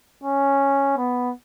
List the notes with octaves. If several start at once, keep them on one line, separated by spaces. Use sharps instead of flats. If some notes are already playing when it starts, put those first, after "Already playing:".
C#4
B3